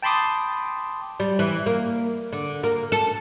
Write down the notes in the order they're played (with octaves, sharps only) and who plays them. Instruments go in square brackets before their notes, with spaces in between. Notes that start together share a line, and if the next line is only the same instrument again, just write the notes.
[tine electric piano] G5 A5 B5 C6 D6 D#6
[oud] G3
E3
A#3
D3
A#3
A4